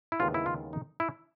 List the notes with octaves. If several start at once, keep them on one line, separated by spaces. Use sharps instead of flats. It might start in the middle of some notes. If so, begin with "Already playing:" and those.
E4
D#2 C#3 E3 G#3 B3 F4
E4
F4
D#4
E4